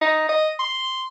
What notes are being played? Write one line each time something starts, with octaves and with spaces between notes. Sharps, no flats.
D#4
D#5
C6